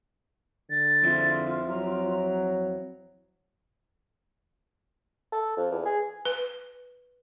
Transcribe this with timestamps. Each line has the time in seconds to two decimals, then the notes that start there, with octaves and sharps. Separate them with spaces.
0.70 D3 A6
1.02 F2 C4 E4 F4
1.68 F#3 A#5
5.32 A4
5.57 F2
5.71 E2
5.85 G#4
6.25 B4